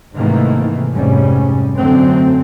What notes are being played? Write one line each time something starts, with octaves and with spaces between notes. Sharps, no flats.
G#2 C3 D#3 E3 A3 A#3
F1 G#2 C3 G3 C#4
F#2 D3 F#3 A3 C4